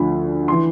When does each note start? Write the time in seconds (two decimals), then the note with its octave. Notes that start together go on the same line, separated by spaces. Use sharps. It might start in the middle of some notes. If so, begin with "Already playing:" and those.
Already playing: D2 D3 F3 B5
0.48 E3 C6